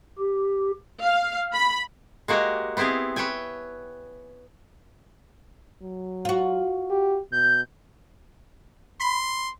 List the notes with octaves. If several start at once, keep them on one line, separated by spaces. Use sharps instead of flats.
G4
F5
B5
G#3 A#3 F#4 G4
B3 C4 E4 G4 G#4
B4 C#5 E5 G5 G#5
F#3
F4 F#4
G4
B2 G6
B5 C6